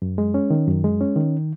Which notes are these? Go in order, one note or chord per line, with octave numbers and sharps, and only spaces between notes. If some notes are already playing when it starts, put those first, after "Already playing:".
F#2
G#3
C#4
D#3
F#2
G#3
C#4
D#3